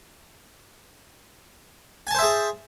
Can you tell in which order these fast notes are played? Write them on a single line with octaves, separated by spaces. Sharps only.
G#5 A5 C5 E5 G#4